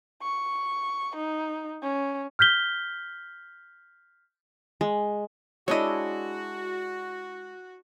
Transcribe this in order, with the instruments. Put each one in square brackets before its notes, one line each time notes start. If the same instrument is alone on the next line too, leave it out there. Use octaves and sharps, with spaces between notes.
[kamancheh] C#6
D#4
C#4
[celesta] F6 G6 B6 G7
[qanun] G#3
[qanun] G#3 D4 E4 [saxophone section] F#4 [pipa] C#5 D#5